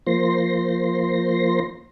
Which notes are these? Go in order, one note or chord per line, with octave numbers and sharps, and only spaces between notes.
F3 A#3 C5 C6 A#6